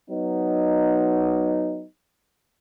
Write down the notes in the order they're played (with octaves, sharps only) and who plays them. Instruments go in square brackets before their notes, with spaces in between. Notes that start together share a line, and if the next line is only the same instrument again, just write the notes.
[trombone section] F#3 B3 D#4